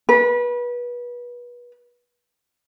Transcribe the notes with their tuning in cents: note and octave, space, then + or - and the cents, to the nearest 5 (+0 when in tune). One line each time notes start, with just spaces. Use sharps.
B4 -30